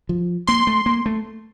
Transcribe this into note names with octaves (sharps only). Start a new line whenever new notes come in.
F3
A#3 C6
A3
A#3
A3